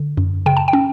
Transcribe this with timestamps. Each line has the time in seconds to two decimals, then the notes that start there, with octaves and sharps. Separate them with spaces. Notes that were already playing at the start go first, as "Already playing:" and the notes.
Already playing: D3
0.17 F#2
0.46 C#3 G5
0.57 A5
0.68 G5
0.73 C#4